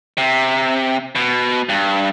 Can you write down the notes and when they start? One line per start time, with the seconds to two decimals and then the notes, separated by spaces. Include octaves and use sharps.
0.18 C3
1.16 B2
1.69 G2